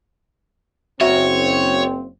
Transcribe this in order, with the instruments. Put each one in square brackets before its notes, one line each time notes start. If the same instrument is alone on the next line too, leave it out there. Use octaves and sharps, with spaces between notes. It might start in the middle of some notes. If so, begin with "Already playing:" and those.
[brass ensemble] F#1 C4 [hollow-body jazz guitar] F#4 E5 [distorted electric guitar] C#5